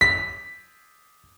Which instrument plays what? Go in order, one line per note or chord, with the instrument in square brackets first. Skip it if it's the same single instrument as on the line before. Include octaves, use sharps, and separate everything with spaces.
[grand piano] B6